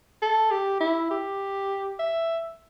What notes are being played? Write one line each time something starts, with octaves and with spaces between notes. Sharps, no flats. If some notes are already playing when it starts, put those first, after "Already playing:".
A4
G4
E4
G4
E5